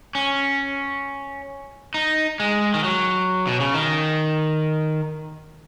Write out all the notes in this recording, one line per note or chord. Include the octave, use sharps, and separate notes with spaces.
C#4
D#4
G#3
D#3
F#3
B2
C#3
D#3